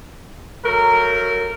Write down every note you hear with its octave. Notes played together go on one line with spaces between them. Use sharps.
F#3 A3 A#4